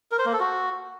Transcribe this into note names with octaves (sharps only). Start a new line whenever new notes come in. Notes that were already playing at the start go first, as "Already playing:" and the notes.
A#4
C5
A#3
A4
F#4